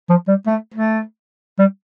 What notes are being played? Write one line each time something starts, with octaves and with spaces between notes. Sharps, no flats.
F3
G3
A3
A3
G3